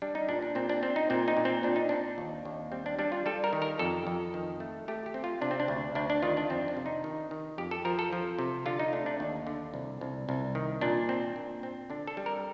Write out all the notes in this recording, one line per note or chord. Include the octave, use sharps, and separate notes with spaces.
G3 D4
D#4
A#2 D4
D4
A#2 C4
D4
C4
D#4
A#2 C4
D#4
A#2
C4
A#2 D4
D#4
C4 D4
D#2
D#2
G3 C4
D4
G3 D4
F4
G3 A4
A#4
D#3
A#4
F2 A4
F2
D#3
A3
A3 G4
G4
C4
F4
C3 D4
C4
D4
D2
D2 D4
D4
D#3 F4
D4
F2 C4
D4
C3
D#4
D#3
D#3
F2 G4
A4
F3 A#4
A4
F3
C3
D3 F4
D#4
A3 D4
D4
D#2 D4
D3
C2
C2
C2
D#3
A#2 D4
C4
A#2
C4
D3 D4
A4
G3
A#4